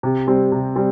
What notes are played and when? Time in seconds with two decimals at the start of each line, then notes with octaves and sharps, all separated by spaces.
0.03 C3
0.27 G3 C4
0.52 C3
0.76 G3 C4